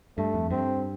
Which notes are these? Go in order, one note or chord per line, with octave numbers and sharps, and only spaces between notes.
G2 A3
F2
G2 C4